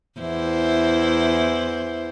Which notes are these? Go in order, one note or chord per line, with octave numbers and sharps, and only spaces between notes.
E2 E4 C5